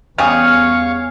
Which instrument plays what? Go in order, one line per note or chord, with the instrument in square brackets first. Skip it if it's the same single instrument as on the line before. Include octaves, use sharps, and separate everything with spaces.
[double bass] E2 [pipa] C#3 G3 G#4 [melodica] C#5 F5 C#6 [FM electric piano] F6